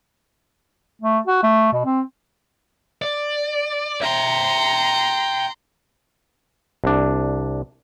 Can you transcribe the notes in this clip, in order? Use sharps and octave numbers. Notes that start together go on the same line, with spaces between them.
A3
F#4
A3
B2
C4
D5
E5 G5 A#5 C6
C2 D4